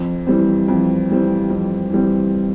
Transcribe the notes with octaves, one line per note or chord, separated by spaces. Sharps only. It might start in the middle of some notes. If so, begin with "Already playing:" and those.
Already playing: F2
E3 G3 C4
F2
E3 G3 C4
F2
E3 G3 C4